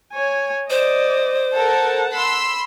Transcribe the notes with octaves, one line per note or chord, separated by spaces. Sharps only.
C#5 G#5
C5 D5 D#5
A4 A#4 F#5 A5
B5 C6 E6